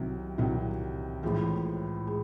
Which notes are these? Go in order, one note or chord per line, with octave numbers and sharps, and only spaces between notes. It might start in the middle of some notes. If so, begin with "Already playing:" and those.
Already playing: C2 C3 D#3 F#3
C2 C3 D#3 F#3
A1 A2 F3 G#3
G#3